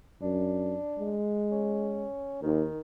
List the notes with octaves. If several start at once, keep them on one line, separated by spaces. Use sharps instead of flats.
F#2 D4
G#3
C#4
D#2 D#3